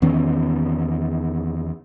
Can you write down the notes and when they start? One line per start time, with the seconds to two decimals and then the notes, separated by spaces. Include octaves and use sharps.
0.02 E2 D#3 B3 C#4